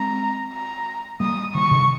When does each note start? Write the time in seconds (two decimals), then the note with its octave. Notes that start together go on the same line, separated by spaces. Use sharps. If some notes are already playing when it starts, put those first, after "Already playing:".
Already playing: G#3 C4 A#5
0.53 A#5
1.20 G3 A#3 D#6
1.55 D#3 G3 C#6
1.71 C3 D#3